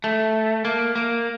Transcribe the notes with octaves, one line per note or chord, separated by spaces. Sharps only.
A3
A#3
A#3